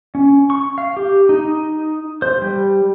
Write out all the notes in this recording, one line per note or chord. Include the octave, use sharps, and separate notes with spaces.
C#4
C#6
F5
G4
D#4
C5
G3